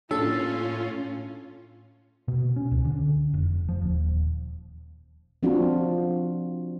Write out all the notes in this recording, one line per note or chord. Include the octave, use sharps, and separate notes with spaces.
A2 A#3 C#4 D4 F4 A4 C#5
B2
C#4
C#2
D3
F1
F3
D#1
F3 C4 D4 F4 F#4